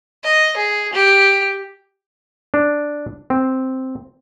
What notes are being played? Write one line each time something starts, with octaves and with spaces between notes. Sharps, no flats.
D#5
G#4
G4
D4
C4